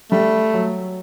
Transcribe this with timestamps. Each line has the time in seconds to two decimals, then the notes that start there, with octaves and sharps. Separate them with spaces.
0.11 G3 A3
0.54 F#3